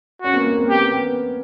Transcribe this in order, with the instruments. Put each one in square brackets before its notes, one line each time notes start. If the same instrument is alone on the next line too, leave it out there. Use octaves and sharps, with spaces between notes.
[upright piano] C#4 [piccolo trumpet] F#4
[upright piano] A#3 C4
A#3
A#3 C4
[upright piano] B3 [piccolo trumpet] G4
[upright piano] B3